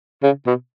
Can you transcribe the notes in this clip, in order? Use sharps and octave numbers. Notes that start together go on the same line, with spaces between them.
C#3
B2